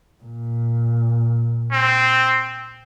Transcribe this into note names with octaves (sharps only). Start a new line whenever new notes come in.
A#2
C4